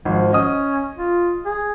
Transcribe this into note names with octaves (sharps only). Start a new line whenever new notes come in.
G#1 F3
C#4 D#5 D#6
F4
G#4